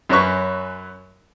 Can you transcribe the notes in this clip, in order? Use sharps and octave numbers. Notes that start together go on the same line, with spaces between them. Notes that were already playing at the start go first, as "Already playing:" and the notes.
F#2 F#3 C#4 B4 C#6